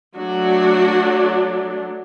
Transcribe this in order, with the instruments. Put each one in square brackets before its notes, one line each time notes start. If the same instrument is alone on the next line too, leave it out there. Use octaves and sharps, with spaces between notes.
[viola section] F#3 A3 D4 F#4